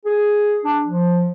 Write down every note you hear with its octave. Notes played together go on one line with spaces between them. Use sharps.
G#4
D4
F3